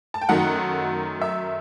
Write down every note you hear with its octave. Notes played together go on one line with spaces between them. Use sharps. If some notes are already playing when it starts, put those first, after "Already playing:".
A5
G5
F#2 D#3 F#3 A3 D#4 F#5
E5